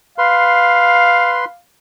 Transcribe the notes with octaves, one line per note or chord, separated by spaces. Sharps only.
B4 F5 C6